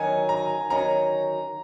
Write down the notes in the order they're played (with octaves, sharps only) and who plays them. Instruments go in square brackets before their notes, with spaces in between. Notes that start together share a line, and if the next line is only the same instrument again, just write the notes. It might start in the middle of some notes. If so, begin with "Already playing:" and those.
Already playing: [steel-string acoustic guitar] D#3 F#3 C#4 [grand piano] G#5 A#5
[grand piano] A#5
[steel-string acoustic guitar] D#3 F#3 C#4 [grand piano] A#5